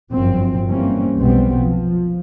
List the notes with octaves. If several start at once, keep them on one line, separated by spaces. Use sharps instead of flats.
G1 F#2 F3 C4
E3 G3 A#3 C4 C#4
F1 B1 B2 G3 B3 C4
F3